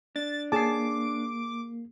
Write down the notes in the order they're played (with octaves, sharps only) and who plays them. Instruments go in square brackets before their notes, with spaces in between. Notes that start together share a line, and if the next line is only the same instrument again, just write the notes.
[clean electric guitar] D4 [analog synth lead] A6
[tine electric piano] A#3 C7 [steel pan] G#4 A5 [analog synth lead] D6